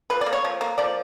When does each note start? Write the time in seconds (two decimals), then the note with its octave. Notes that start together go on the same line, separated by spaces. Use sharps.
0.10 F3 B4
0.21 D5
0.26 A#3
0.33 C#5
0.44 F3
0.61 A#3
0.78 F3 D5